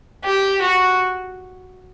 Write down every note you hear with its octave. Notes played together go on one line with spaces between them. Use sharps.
G4
F#4